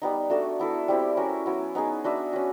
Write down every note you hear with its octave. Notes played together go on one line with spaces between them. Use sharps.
G3 B3 D#4
A3 D4 F#4 A4
B3 E4 A4
G3 C4 E4 G4
C#4 F#4 A#4
F#3 B3 E4
B3 D#4 G#4
D4 F#4 B4 E5
C#4 F#4